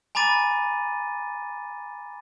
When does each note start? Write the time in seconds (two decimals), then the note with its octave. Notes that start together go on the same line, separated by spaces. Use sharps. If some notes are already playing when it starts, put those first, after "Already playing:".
0.15 G#5 A#5 B5 D6 A6 D#7